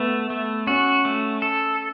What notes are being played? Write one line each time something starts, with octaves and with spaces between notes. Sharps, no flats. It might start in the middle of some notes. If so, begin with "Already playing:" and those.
Already playing: A3 B3
A3
C#4 F#4
A3
A4